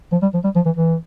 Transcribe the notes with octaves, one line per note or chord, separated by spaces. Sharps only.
F3
G3
F3
G3
F3
E3
E3